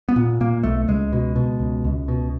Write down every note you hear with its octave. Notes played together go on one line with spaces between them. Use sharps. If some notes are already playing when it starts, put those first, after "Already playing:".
B3
A#2
A#2 A#3
B1 A3
C#2 G#3
B2
B2
C#2
C#2
B2